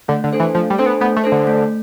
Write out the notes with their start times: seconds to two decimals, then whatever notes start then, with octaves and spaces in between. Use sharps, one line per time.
0.08 D3 A3
0.24 D3
0.33 D4 A4 C5
0.40 E3
0.55 F3 A3
0.70 G3
0.78 C4 D4 A4 C5
0.86 B3
1.01 A3 B3
1.17 A3
1.24 D4 A4 C5
1.32 D3
1.47 A3